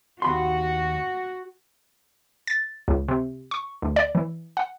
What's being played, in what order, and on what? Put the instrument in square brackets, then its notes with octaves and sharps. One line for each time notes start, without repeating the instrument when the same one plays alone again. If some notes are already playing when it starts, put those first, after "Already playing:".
[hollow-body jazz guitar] D#2 B5 C6 [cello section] F#4
[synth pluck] A6
C#2
C3
C#6
D2
D5
E3
F#5